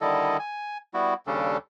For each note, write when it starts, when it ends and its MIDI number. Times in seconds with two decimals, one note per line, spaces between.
0.01 0.37 50
0.01 0.37 51
0.01 0.37 55
0.01 0.37 64
0.01 0.37 69
0.01 0.37 75
0.39 0.78 80
0.94 1.14 55
0.94 1.14 59
0.94 1.14 64
0.94 1.14 66
1.27 1.57 39
1.27 1.57 49
1.27 1.57 55
1.27 1.57 61
1.27 1.57 62
1.27 1.57 69